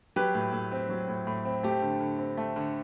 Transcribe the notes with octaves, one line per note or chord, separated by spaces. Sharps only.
F#3 G4 B4
A2
A2
C4
F#3
A2
A2
C4
A3 G4
D3
D3
C4
A3
D3